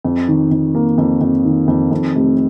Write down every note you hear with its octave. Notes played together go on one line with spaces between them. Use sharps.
F2
D#3
F2
A#3
F2
F2
D#3
F2
F2
F1